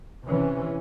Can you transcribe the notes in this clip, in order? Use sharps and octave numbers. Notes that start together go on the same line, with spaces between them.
C3 E3 C#4